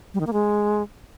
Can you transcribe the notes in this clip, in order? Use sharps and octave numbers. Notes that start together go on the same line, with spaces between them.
G3
D#3
A#3
G#3